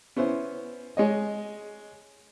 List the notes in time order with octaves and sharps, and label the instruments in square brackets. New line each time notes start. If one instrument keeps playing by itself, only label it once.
[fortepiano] B3 C#4 E4 C5
G#3 C#5 D#5